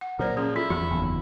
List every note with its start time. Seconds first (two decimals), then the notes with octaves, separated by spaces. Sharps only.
0.01 F#5
0.19 A#2 F#3 A#4 C5 D5
0.37 F3 C#4 G#4
0.56 E4 F4 A4
0.70 E2 F3 B3 F#4
0.91 F#1 E2 D#3